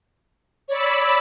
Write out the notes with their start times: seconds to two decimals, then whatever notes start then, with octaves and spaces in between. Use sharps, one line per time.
0.69 C#5 D5 B5 E6